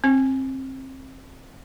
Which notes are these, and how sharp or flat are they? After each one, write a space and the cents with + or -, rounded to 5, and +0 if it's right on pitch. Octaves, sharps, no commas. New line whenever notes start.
C4 +25